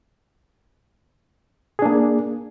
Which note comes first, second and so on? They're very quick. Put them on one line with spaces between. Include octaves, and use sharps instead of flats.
G#4 D4 A#3